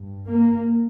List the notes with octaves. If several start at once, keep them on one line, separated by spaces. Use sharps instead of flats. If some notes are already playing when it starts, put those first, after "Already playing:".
Already playing: G2
A#3